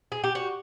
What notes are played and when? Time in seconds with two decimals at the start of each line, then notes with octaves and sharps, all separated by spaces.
0.12 G#4
0.24 G4
0.35 F#4